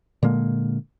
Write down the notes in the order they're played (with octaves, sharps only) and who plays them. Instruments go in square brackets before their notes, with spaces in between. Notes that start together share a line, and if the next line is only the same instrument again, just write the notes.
[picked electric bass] A#2 D3 G#3 A#3